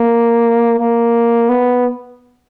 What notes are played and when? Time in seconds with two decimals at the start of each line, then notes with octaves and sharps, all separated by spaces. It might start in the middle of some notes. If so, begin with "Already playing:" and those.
Already playing: A#3
0.79 A#3
1.49 B3